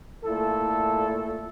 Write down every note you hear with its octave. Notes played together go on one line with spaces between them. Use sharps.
A#2 A3 E4 A4